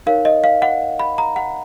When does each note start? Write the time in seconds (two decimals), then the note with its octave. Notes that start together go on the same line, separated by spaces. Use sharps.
0.06 D#4 A#4 C#5 F5
0.25 D#5
0.44 F5
0.62 F#5
0.99 B5
1.18 A#5
1.36 F#5